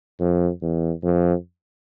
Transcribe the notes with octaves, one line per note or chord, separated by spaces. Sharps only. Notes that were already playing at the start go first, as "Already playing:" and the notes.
F2
E2
F2